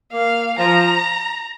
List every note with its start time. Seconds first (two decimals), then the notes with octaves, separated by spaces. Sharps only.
0.12 A#3 F5
0.58 F3 A#5